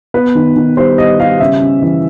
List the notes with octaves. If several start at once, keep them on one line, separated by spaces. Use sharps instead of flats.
B3 B4
D#3
D#3
G3 C5
G3 D#5
G3 F5
C#3 E5
C#4
E3